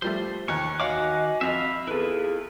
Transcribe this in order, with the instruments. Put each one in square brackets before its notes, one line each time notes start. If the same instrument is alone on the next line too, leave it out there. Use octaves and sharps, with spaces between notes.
[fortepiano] F3 G3 A3 [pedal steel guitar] C5
[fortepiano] D#2 [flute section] G5 F#6 [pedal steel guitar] C#6
[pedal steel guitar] D#3 F#5 D6 [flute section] F#4 D#5 G#5 [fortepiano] C#5 F5
[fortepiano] F2 [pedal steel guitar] E5 F5 B5
[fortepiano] E2 B4 [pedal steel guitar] E4 F4 [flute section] G#4 A4